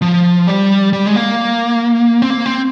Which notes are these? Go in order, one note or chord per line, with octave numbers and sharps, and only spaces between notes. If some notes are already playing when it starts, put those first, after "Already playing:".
F3
G3
G3
G#3
A#3
C4
A#3
C4